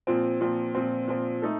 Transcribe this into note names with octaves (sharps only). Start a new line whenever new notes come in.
A#2 F3 C4
A#2 F3 C4
A#2 F3 C4
A#2 F3 C4
A3 D#4 A4